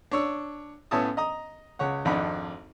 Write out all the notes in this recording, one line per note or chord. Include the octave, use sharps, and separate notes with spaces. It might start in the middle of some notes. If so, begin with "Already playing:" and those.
D4 C#5 E6
A2 B3 C#4 E5 A5 D#6
D#5 A#5 D#6
C#2 C#3 C#5 F#5
G#1 F2 D4 D#4 F#5 B5